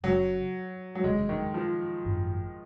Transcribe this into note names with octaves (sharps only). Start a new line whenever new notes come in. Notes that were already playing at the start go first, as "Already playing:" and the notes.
F#1 F#2 C#3 F#3
F#3
F1 D#2 C#3 G#3
D#3
F3
G#1 F#2 D#3 F#3